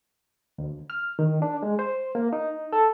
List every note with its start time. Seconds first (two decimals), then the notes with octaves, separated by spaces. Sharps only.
0.58 D2
0.90 F6
1.19 D#3
1.42 D4
1.63 G#3
1.79 C5
2.15 A#3
2.33 D#4
2.73 A4